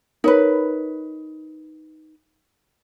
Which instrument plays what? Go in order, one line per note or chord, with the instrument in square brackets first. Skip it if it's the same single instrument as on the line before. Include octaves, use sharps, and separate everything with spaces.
[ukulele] D#4 B4 [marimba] A#4 C#5